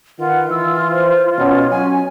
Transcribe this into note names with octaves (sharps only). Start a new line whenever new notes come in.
D#3 F4 B4 F#5
E3 E6
C5
B2 C#4 C#5
F#3 C#4 G#5